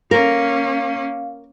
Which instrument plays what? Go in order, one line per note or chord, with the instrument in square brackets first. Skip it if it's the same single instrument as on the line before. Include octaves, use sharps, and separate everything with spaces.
[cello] A#3 C#4 [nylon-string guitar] A#4 [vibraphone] F5